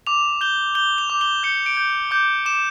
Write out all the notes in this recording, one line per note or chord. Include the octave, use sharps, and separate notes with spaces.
D6 F7
G6 G7
G6 G7
F7
D6
G7
G6 C#7
D7
G6
D6 G6
D6 E7